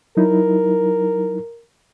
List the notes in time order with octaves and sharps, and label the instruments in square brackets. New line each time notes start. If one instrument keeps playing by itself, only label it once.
[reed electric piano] F#3 D#4 E4 [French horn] A#4